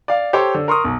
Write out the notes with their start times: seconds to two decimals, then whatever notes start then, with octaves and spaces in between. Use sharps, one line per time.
0.08 D5 F5
0.33 G4 A4 C5 C#5
0.55 D3
0.68 A#4 C6 C#6 D#6
0.84 B1